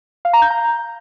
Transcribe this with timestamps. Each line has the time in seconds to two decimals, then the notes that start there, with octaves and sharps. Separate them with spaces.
0.25 F5
0.33 A#5
0.42 G6
0.50 A#5